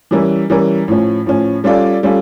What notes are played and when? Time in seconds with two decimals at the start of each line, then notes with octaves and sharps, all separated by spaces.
0.11 E3 G3 C#4 E4 A#4
0.50 E3 G3 C#4 E4 A#4
0.88 A2 F3 C#4
1.26 A2 F3 C#4
1.64 G3 C#4 F4 A4 D5
2.03 G3 C#4 F4 A4